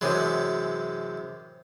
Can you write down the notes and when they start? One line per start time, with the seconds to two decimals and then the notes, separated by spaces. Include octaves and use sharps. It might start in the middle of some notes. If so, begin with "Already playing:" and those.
0.01 F#2 C3 E3 F#3 G#3